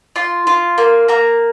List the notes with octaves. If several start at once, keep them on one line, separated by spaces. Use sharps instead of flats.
F4 C6
F4
A#3
A#3 A#5